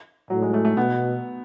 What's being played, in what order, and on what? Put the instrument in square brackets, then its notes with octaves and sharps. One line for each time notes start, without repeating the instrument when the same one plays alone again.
[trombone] A2 [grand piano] F#3
[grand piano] G#3
A3
A3
[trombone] B2 [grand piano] B3